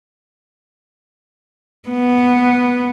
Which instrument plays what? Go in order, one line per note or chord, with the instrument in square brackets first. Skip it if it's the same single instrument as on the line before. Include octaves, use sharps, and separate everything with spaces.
[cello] B3